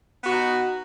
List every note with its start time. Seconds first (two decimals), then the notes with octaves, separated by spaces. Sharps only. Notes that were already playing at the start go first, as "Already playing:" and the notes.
0.22 B3
0.26 F#4
0.30 D#4